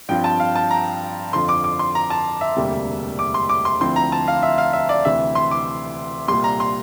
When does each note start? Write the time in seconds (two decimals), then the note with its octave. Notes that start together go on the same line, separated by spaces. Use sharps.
0.09 G2 F3 C4 F4 G5
0.24 A5
0.40 F5
0.56 A5
0.71 A#5
1.33 F2 D3 F3 C6
1.49 D6
1.64 D6
1.79 C6
1.95 A#5
2.10 A5
2.41 E5
2.57 E1 D2 C3 G3 A#3
3.19 D6
3.34 C6
3.49 D6
3.65 C6
3.81 D2 D3 F3 C4 E4 C6
3.96 A#5
4.12 A5
4.28 F5
4.43 E5
4.58 F5
4.73 E5
4.89 D5
5.05 D2 C3 E3 E5
5.35 C6
5.51 D6
6.28 C2 A#2 G3 C6
6.44 A#5
6.60 C6